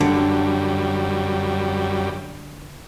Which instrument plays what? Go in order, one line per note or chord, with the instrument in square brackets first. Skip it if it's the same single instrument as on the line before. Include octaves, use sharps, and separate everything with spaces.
[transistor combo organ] F#2 G3 [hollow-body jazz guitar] D3